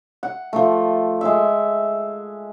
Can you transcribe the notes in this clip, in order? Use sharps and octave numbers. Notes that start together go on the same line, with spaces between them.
F#5
F3 A3
G#3 E5